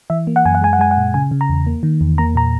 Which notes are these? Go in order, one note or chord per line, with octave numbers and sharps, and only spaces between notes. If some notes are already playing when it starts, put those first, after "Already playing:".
E3 E5
A#3
F#5
F#2 G#5
F#5
G#3 G#5
F#5
G#3 G#5
F#5
A#2
C#3 G#5
C#3
A#5
E2
A#3
D#3
E2
A#3 A#5
A#2 A#5